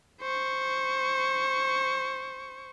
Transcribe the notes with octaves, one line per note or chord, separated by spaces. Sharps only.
C5 C#6